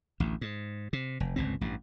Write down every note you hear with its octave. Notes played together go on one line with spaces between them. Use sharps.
A1 D2
G#2
C3
F1
G1 C#2 A#2 C4
A1 G2